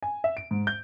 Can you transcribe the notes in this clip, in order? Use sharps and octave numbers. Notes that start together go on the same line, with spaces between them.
G#5
E5
D7
G#2
G6